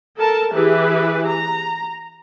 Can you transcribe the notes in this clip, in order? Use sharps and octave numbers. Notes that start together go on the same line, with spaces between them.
A4 A#4 A5
E3 E4 G4 G#4 B4
A#5